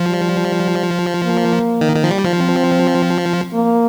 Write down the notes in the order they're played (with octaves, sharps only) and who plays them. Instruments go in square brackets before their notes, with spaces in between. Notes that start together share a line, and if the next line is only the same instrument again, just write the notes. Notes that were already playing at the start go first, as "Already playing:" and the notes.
Already playing: [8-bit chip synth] F3
[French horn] G3
A#3
[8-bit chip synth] D#3
D#3
F3
G3
F3
[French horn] C4
A#3